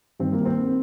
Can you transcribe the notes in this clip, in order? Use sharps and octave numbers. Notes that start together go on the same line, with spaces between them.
G2 D#3 C4
A#3
C4